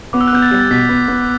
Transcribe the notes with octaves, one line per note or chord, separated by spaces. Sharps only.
B3 D6
E6
F#6
B3 G6
A6
G3
A6
B2 B6
B3
B3